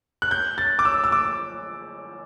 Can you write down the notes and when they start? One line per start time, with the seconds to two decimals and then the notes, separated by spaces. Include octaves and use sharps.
0.22 F#6
0.31 G6
0.58 A6
0.79 D6
0.85 E6
1.04 E6
1.12 D6